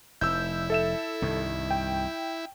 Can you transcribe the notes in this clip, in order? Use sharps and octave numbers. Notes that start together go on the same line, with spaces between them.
F1 E4 E6 G6
A4 E5 E7
C2 G2 D#3
G5